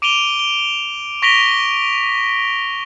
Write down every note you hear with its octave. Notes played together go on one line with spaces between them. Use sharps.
D6 D7 D#7 F7 G7
G7
C#6 A#6 B6 D7 F7 G7